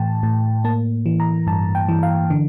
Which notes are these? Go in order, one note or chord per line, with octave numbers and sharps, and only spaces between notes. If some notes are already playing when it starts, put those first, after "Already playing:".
Already playing: A2 E3 G5 A5
A2
A#3 A5
E3
A#5
G2 A5
G5
E3
F5
D3